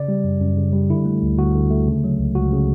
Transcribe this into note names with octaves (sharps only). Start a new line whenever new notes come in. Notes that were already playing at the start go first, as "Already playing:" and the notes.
Already playing: C#3 D5
G3
F#2
F#2
C#3
G3
D3 E4
A3
D2
D2 F#4
D3
A3
C#3
F#3
C#2
C#2 F#4
C#3